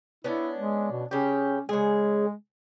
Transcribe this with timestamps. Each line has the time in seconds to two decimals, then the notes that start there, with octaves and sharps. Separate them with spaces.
0.24 B3 C#4 D4 E4
0.57 G#3
0.91 B2
1.11 C#3 C#4 G4
1.69 C#3 G#3 G#4